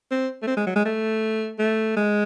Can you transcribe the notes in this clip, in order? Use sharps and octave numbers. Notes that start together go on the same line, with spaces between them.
C4
A3
C4
G#3
F#3
G#3
A3
A3
G#3